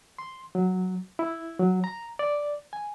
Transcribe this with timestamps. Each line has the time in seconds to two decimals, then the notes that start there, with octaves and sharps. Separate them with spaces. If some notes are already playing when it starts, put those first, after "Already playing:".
0.18 C6
0.55 F#3
1.19 E4
1.59 F#3
1.84 A#5
2.19 D5
2.73 G#5